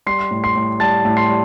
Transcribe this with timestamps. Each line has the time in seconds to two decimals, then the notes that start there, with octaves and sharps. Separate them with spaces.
0.06 G3 C6 C7
0.31 A2
0.44 C6 C7
0.56 A2
0.80 G3 A5 A6
1.05 A2
1.17 C6 C7
1.29 G3